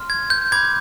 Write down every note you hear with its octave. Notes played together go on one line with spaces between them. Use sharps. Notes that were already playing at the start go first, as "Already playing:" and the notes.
Already playing: C6 F6
G#6
G6
B5 D6 G6 G#6